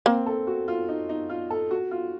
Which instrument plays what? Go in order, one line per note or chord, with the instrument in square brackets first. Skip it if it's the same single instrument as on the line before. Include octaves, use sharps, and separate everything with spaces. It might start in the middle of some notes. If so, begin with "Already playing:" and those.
[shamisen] A#3 [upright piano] C4
[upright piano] A4
F#4
F4
D#4
D#4
F4
A4
F#4
F4